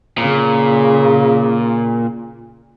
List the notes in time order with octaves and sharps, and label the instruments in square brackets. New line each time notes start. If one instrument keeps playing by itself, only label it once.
[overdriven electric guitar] A#2 [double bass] C#3